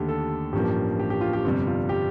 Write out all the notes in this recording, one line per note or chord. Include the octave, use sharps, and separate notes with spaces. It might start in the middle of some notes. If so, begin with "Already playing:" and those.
Already playing: D#2 D3 A3 G4
A4
A1 G2 F3 A#3 G4
G4
G4
F4
G4
G1 F2 C3 G3
F4
G4